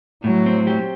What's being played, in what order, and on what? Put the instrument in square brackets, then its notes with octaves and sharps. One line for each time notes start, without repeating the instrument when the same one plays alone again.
[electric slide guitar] A2 [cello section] F#3
[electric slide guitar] C4
G4